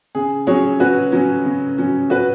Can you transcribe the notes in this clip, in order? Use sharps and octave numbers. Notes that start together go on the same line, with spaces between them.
C#3 G#4
F#3 C#4 G#4 C#5
C#3 F#4 B4
F#3 C#4
C#3
F#3 C#4
C#3 F#4 B4